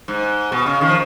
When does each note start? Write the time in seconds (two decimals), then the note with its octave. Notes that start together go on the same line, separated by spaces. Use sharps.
0.08 G#2
0.52 B2
0.66 C#3
0.81 D#3
0.88 F3